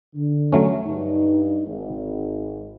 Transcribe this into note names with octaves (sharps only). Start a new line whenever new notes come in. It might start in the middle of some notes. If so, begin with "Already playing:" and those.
D3
F#3 A3 C#4
G2 D#4
G#1